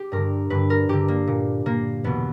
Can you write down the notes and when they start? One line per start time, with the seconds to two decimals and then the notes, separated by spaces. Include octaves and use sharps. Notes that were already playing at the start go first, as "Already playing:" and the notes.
Already playing: G4
0.12 G2 D3 A#4
0.50 G2 D3 B4
0.70 A#4
0.89 G2 D3 G4
1.08 A#3
1.27 A#2
1.66 A#2 A#3
2.04 E2 B2 B3